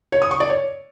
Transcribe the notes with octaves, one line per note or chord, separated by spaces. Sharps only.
C#5
D#6
C#6
D5
C#5